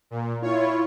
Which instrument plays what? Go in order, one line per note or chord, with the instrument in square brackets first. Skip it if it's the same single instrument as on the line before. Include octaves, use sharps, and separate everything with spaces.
[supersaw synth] A#2
[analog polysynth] E4 F4 [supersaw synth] C#5